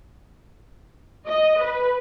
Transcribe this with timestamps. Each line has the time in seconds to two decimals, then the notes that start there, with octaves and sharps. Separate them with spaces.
1.27 D#5
1.61 B4